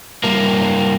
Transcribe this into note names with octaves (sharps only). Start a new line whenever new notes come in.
G2 A#3